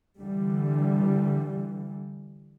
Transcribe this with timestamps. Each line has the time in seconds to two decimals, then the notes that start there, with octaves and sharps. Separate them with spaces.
0.21 D3 E3 G3